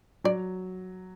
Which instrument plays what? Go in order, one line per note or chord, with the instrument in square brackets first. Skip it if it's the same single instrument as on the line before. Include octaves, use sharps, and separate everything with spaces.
[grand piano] F#3 [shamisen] D5